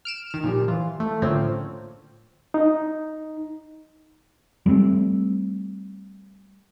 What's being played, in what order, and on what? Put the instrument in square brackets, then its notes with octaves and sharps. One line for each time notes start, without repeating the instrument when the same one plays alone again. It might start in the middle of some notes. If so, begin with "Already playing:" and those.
[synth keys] F6 D7 E7
D#3 F6
A#2 F3 G3
E3 F4
A3
A2 D3 F3 A#3 C4 C#4
[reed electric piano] D#4
[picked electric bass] G3 A3 B3 C4